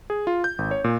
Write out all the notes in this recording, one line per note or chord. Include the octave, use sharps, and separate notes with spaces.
G#4
F4
G6
G#1
C#5
A#2